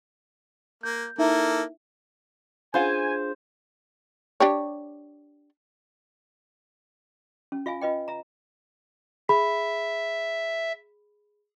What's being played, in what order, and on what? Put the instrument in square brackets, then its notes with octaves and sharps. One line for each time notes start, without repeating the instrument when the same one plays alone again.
[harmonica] A#3 [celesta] G6
[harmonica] A#3 A4 A#4 [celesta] D#4 E4 E5
[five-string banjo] C#4 F4 F#5 [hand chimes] D4 G#4 [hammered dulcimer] C5 [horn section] G#5
[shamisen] D4 G4 C#5
[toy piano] C#4
F4 E5 F5 G#5
F4 B4 D#5 G5
E5 A#5
[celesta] G#4 B5 [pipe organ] E5